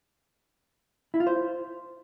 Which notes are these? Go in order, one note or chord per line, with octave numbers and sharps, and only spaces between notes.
E4
F4
C5